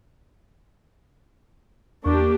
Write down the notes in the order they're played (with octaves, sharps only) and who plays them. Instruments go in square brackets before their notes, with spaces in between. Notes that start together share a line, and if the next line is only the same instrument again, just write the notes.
[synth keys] E2 C#6 [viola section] A#3 D4 G4